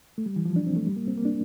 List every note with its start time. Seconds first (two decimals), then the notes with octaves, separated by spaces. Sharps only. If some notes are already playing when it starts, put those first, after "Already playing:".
0.18 A3
0.26 G3
0.36 E3
0.45 F3
0.56 D4
0.67 C4
0.76 A3
0.87 G3
0.96 A#3
1.07 C4
1.18 A#3
1.25 D4